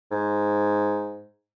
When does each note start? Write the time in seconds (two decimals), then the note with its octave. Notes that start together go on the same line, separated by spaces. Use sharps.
0.11 G#2